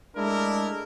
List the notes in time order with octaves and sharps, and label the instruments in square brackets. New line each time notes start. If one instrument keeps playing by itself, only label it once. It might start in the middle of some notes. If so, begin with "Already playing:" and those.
[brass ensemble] G#3 A3 D4 E4 A#4